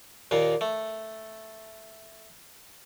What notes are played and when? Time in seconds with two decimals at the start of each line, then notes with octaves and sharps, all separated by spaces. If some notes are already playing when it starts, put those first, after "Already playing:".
0.31 D#2 A#2 A#3
0.61 A3